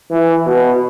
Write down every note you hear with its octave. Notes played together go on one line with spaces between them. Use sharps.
E3
B2